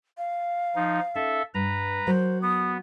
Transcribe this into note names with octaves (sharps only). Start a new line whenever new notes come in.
F5
F3 D#4
C#4 D#4 A4 E5
G2 B4 A#5
F#3 A#4 C5
B3 D#6